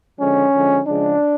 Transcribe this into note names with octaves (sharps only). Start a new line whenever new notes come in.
D3 F3 G#3 C#4
D3 F3 G#3
C#3 F3 G#3 D4